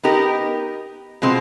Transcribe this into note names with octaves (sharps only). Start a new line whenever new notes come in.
B3 D#4 G4 A#4
B2 G#3 C4 F4